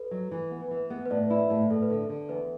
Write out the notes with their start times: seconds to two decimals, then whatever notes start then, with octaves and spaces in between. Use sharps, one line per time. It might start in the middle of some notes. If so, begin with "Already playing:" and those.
Already playing: A4 B4
0.11 F#3
0.31 E3
0.51 B3
0.71 E3
0.90 B3
1.06 B4
1.10 A2 D5
1.30 E4 D5
1.50 A2
1.70 A2 A4
1.82 B4
1.90 D3 A4
2.09 D3
2.29 E2 B4